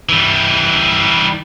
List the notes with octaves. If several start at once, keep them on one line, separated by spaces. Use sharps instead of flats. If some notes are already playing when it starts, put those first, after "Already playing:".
E3 G3